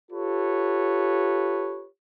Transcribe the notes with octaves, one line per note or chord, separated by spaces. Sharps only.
F4 G4 A4 B4 C#5